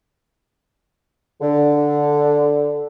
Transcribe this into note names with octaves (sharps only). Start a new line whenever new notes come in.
D3